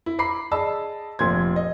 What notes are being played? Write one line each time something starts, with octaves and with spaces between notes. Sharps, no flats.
E4
A#5 B5 D6 C7
G#4 D5 D#5 A5 B5 E6
F1 A#2 C6 G#6
D#5